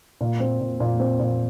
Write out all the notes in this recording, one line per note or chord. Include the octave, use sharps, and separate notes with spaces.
A#2
C4
A#2
A#2
C4
A#2